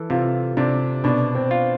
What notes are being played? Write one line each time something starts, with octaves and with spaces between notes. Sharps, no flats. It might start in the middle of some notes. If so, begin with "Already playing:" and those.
Already playing: E3 A4
C3 F4
C3 D4
B2 D4
C4
F4